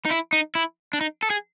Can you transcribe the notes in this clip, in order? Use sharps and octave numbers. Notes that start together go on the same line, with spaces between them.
D#4
E4
D#4
E4
D4
D#4
A4
G#4